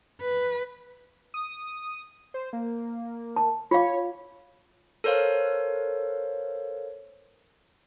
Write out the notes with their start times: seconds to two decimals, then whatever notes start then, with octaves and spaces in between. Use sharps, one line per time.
0.21 B4
1.34 D#6
2.34 C5
2.53 A#3
3.36 A5
3.71 F4 C#5 F5
5.04 A4 A#4 C5 C#5 F5